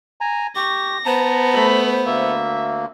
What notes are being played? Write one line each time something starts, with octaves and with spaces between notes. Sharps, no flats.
G#5 A#5
G4 C#6 A#6
B3 C5 A5 A#5
A3 B5
D2 A#3 E5